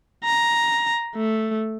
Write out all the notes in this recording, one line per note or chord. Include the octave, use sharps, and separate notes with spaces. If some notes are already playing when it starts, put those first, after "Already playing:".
A#5
A3